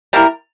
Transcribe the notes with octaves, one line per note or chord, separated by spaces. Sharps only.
G3 A#3 E4 A#4